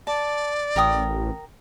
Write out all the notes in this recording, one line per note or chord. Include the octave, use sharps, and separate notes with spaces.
D5 A5
A1 A#4 G5 D#6